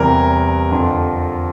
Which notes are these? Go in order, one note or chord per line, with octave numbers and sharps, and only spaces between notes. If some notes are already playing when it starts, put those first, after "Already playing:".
Already playing: E2 C3 E3 G3 A#4
F2 D3 F3